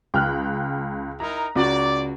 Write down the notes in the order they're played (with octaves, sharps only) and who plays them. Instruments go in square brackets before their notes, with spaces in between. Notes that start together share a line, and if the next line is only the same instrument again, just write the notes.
[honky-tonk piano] C#2 F6 F#6 [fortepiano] G5
[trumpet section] D#4 E4 A#4 [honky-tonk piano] A#5
[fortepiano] C#2 F#4 [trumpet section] D5